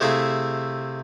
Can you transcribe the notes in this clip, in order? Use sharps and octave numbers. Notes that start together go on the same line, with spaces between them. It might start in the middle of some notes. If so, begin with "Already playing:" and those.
C3 A3 E4 G#4 F5 A#5